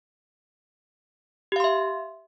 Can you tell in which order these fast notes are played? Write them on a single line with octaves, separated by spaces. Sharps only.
G4 F5 C6 E5